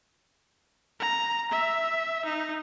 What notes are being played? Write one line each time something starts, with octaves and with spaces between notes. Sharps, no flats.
A#5
E5
D#4